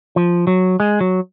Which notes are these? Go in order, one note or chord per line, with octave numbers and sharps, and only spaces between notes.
F3
F#3
G#3
F#3